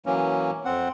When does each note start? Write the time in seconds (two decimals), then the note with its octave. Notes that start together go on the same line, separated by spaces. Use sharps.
0.06 E3 F#3 A#3 C#4
0.65 F2 C4 F#5